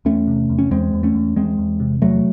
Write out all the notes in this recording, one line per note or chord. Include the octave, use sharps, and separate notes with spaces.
E2 A3 C#4
C3
E2
C#4
E2 G#3 C4
E2
A3 C#4
E2
E2 G#3 C4
E2
C3
E2 F#3 A3